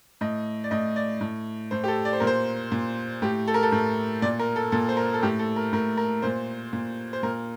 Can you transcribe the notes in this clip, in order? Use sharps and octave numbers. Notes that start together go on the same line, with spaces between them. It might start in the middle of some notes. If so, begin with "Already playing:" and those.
A2 D#5
D5
A2 D#5
D5
A2
A2 C5
G4
A4
D5
C5
A#2 A#4
C5
A#2
A2 G4
A4
A#4
A4
A2
A#2 D5
A#4
A4
A#2 A4
C5
A#4
A4
A2 G4
A4
A#4
A2 A#4
A#4
A#2 C5
A#2
C5
A#2 A#4